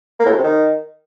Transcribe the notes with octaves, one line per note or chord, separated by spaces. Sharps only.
A#3
A2
F#2
C3
D#3